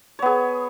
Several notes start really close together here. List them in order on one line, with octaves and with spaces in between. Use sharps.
C#5 B3 G#4